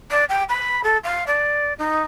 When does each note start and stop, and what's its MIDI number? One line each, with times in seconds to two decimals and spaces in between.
0.10 0.24 74
0.29 0.43 79
0.49 0.80 83
0.83 0.97 69
1.03 1.23 77
1.26 1.73 74
1.78 2.01 63